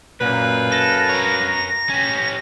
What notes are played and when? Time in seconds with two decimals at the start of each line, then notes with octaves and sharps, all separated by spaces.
0.21 F#2 A#2 B4 F5
0.72 A4 A#6
1.09 A#4 C#5
1.90 C#4 G4